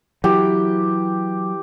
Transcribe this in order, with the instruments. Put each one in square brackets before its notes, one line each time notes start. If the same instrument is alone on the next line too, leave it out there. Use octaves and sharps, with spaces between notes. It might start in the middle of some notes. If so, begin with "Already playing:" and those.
[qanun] E3 [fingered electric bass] F#3 [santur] G4